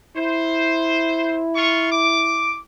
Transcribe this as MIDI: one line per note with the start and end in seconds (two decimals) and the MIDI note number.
0.16 2.65 64
0.16 1.41 72
1.55 1.89 65
1.55 1.89 85
1.92 2.60 86